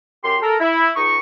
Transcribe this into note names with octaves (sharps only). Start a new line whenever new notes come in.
F#2 G4 C6
A4 A#4
E4
C#2 D#4 C#6